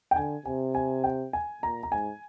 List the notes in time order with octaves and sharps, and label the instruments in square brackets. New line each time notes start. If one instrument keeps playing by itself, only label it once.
[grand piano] G5
[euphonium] D3 [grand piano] G#5
[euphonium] C3 [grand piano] G#5
[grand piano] G#5
G5
G#5
[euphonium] A#2 [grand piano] A#5
[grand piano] A#5
[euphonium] G#2 [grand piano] G#5